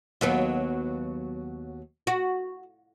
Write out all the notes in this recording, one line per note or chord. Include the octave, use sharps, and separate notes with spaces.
D#2 F#3 B3
F#4